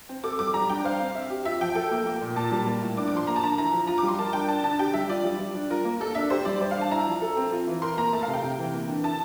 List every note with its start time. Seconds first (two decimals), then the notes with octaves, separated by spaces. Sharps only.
0.09 C4
0.24 A4 D6
0.39 G3 D6
0.54 G3 A#5
0.69 D4 G5
0.84 C5 F5
1.00 C4
1.15 E5
1.30 G4
1.45 F4 E5
1.61 F3 G5
1.75 A4 G5
1.91 A#3
2.06 A#3
2.21 A#2
2.36 A#2 A5
2.52 G3
2.67 A#3
2.82 A2
2.97 D4 D6
3.08 D6
3.12 F3 C6
3.27 A#3 A#5
3.36 A5
3.42 D3 A#5
3.58 E4 A#5
3.72 F3 A#5
3.87 F4 A#5
3.98 D6
4.03 G3
4.08 C6
4.19 A#4 A5
4.33 D4 G5
4.49 D4 A5
4.64 D3 A5
4.79 G4 G5
4.94 G3 E5
5.09 F4 D5
5.24 G3
5.39 G3
5.54 D4
5.70 F4 A#4
5.85 A#3
6.00 A#3 A4
6.15 D4 E5
6.30 G4 C5
6.45 G3 D5
6.61 C5 D5
6.71 F5
6.77 D4 A5
6.91 E4 A#5
7.06 F3
7.22 A4
7.37 C4
7.52 F4
7.67 E3
7.82 A#4 C6
7.97 A#3 A#5
8.13 A3 A5
8.23 F5
8.28 C3
8.33 G5
8.43 C3
8.58 E3
8.74 A#3
8.88 D3
9.03 E4 A5